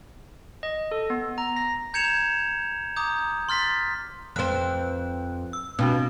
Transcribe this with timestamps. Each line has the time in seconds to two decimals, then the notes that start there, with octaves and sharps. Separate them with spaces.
0.63 D#5
0.91 A4
1.10 B3
1.38 A#5
1.56 A#6
1.94 A#5 G6 G#6 C#7 E7 F7
2.96 A#5 D6 D#6 G6
3.49 C6 F6 A6 B6
4.36 F2 C4 B4 F#6
5.53 E6
5.79 B2 C4 D4 F#4